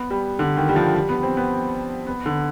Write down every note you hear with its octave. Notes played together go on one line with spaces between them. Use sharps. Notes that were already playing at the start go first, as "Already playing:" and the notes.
Already playing: B3
G3
D3
D#3
G3
F3
G3
B3
C4
B3
B3
D3